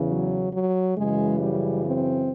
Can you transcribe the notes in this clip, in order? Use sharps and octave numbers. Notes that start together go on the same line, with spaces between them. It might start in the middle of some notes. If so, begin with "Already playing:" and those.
Already playing: E2 C#3 E3
F#3
F#3
F#2 C#3 E3 G#3
G3
C4